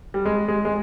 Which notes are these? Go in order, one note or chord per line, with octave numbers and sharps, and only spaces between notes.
G3
G#3
G#3
G#3